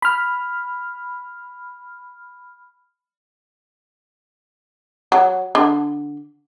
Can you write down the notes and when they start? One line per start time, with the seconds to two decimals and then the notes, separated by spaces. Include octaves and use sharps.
0.02 B5 F6
5.12 F#3
5.55 D3